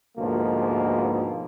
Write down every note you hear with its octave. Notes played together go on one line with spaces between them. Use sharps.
D2 G#2 B2 F3 A#3